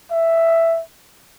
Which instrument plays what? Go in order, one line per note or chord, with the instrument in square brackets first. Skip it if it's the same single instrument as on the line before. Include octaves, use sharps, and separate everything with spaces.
[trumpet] E5